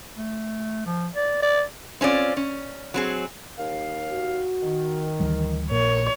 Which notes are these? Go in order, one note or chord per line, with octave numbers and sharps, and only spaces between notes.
A3
F3
D5
D5
C4 C#4 F4 D5
C#4
F#3 C4 G#4
D#2 F5
F#4
D#3
D2 E3 G3
A#1 A#2 A#4 C#5